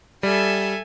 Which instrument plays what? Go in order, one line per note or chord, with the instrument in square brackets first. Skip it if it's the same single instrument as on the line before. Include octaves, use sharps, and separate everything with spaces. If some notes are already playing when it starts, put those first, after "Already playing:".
[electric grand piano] G3 [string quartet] A4 E5 G#5